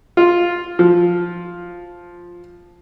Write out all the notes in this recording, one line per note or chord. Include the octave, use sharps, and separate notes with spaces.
F4
F3